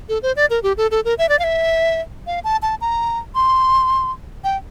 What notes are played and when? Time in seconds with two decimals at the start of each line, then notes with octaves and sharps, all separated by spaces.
0.09 A4
0.22 C5
0.36 D5
0.50 A#4
0.63 G4
0.77 A4
0.91 A4
1.05 A#4
1.18 E5
1.29 D5
1.39 F5
1.44 E5
2.27 F5
2.44 A5
2.62 A5
2.81 A#5
3.35 C6
4.44 G5